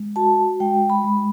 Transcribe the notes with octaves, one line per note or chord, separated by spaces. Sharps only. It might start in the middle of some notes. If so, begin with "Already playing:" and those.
Already playing: G#3
F#4 A5
G#3 G5
B5
G#3